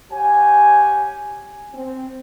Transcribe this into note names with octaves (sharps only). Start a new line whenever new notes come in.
G4 C#5 F#5 G#5
C4